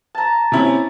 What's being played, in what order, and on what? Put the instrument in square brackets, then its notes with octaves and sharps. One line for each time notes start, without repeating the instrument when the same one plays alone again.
[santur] A5 A#5
[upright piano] C3 C#4 E4